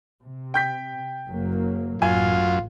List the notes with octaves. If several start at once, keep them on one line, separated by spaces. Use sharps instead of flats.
C3
G5 G6 B6
F#1 F#3 A#3
A1 F#2 F4 G#5